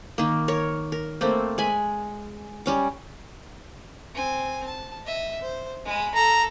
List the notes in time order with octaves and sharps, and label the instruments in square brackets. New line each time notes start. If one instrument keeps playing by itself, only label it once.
[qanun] D#3 A#3
A#4 C#5
A#4
A3 A#3 C4
G#3 G#5 B5
G3 C#4 D6
[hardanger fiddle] C4 G#5
A5
D#5 E5
C5
G#3 B5
[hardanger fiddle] A4 [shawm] A#5